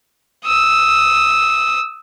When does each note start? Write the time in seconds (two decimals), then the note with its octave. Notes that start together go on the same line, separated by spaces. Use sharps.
0.47 D#6 E6